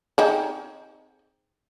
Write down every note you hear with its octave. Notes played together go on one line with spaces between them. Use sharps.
C4 D#4 G#4